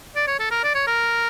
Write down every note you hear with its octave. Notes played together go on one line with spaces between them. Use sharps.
D5
C#5
A4
A#4
D5
C#5
A#4